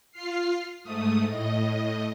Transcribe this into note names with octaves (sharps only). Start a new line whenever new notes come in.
F4 F6 C7
G#2 A3 D#6
A2 D#5